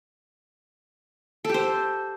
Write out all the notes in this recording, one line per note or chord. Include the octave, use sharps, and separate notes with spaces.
G4 A4 C5